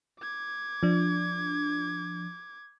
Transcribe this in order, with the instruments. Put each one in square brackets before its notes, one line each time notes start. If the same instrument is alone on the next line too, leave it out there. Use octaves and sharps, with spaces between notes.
[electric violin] D6 G#6
[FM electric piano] F3 D4